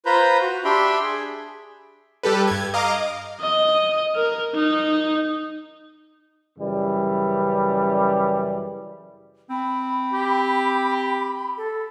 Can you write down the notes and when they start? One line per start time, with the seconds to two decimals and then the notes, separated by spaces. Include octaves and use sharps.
0.06 F4 B4 C5 A#5 B5 G6
0.41 F#4
0.65 D4 G4 E5 G5 B5 C6
1.03 G#4
2.23 G3 G4 A4 B4
2.47 G2 G#6
2.74 D#5 F5 A#5 D6
3.41 D#5
4.16 A#4
4.55 D#4
6.58 F#2 C#3 E3 G3
9.50 C4 B5
10.13 G4
11.57 A4